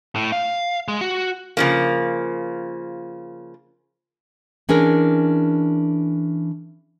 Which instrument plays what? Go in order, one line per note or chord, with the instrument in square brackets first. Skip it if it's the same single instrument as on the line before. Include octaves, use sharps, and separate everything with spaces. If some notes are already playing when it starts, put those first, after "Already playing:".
[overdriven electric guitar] A2
F5
G#3
F#4
[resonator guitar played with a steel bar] C#3 F3 A#3
[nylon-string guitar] E3 C#4 D4 G#4 A#4